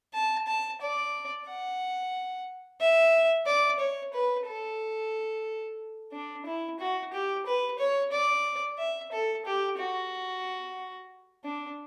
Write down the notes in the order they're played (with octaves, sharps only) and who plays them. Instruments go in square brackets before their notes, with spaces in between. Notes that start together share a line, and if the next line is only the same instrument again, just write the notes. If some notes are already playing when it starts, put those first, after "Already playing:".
[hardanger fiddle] A5
A5
D5
F#5
E5
D5
C#5
B4
A4
D4
E4
F#4
G4
B4
C#5
D5
E5
A4
G4
F#4
D4